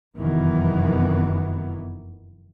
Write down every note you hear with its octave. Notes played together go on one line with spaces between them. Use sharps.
F1 F#2 D#3 E3 B3